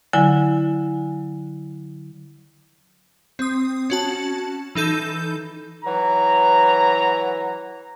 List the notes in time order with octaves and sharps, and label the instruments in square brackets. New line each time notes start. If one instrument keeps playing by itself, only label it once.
[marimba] D3 F#3 E4 G#5
[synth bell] C4 D#6
C#4 F#4 A5
E3 D#4 A4 G6
[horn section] E3 F#3 A#5